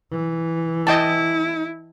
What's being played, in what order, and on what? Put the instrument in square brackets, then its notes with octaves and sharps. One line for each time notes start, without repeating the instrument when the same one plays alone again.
[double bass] E3
[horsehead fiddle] E4 [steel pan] D#5 G5 A5